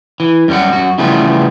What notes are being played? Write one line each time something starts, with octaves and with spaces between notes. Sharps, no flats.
E3
F#2 G3 A4 F#5
F#2 F#4
C#3 E3 F3 G3 A3 B3